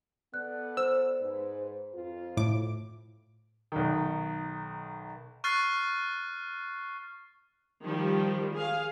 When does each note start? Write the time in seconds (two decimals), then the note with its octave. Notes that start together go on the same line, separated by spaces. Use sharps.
0.34 B3 A4 D5 F#6
0.77 C5 E6
1.20 G#2 B4
1.94 F2 F4
2.37 A2 D6
3.72 B1 D#3
5.44 C#6 F6 F#6 A6 C7
7.82 D#3 F3 G3
8.53 G#4 F5